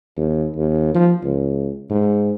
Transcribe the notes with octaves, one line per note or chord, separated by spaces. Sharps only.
D#2
D#2
F3
C#2
G#2